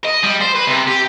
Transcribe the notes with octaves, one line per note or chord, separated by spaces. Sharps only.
D#5
G3
C5
B4
C3
G4